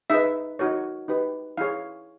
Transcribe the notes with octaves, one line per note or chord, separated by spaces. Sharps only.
D#4 G#4 B4 E5
D#4 F#4 A#4 C#5
D#4 G4 B4
E4 G#4 C#5 F5